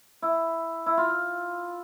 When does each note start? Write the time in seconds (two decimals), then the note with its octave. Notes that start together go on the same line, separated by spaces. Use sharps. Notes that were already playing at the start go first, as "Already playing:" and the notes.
0.22 E4
0.86 E4
0.97 F4